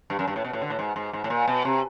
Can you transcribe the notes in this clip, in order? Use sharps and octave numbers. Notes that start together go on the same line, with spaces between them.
G2
F#2
G2
A2
B2
A2
D3
A2
G#2
G#2
G#2
A2
A#2
B2
C3